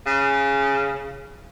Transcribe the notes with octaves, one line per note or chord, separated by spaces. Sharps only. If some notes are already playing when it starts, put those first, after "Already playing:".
C#3